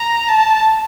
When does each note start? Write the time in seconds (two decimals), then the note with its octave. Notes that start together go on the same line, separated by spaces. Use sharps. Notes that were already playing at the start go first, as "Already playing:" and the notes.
Already playing: A#5
0.28 A5